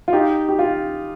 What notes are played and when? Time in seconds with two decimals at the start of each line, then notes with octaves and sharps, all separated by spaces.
0.08 F4
0.13 D#4 G4
0.49 G4
0.59 F4